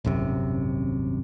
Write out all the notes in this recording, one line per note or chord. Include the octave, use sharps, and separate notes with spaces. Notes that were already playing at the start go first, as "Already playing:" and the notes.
D#1 G#1 F#2 C3